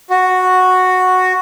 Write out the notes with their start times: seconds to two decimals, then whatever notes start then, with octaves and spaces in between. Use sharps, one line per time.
0.10 F#4